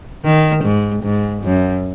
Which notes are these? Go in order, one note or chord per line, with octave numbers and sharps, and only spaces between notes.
D#3
G#2
G#2
F#2